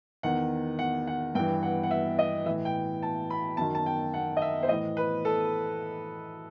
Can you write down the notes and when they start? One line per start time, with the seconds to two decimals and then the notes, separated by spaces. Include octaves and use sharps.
0.23 E2 D#3 F#5
0.79 F#5
1.07 F#5
1.35 G2 G5
1.39 E3
1.63 F#5
1.83 F#5
1.91 E5
2.19 D#5
2.46 A2 E3 E5
2.65 G5
3.03 A5
3.30 B5
3.57 F#2 D#3 A5
3.75 A5
3.86 G5
4.14 F#5
4.37 D#5
4.42 E5
4.63 C5
4.69 A2 E3 D#5
4.97 B4
5.25 A4